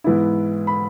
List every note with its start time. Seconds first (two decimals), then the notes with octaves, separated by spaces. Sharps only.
0.04 G#2 E3 B3 E4
0.67 B5